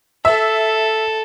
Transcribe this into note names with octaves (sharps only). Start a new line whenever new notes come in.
A4 E5